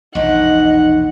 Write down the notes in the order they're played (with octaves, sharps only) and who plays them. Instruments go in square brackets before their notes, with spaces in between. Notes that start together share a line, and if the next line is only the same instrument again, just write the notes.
[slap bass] E1 A#1 [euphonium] D#4 [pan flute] D#5 [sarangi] F#5